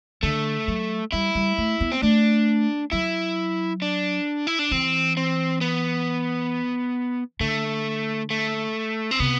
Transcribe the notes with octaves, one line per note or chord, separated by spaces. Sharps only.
D3 A3
F#3
G3 E4
G3
A3
B3
C4
A3 D4
F#3 E4
D4
E4
D4
E3 C4
C4
B3
D3 A3
A3
C4
C3 B3